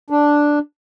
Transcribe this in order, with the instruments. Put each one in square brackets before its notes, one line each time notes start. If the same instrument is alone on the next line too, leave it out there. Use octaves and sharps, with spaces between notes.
[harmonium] D4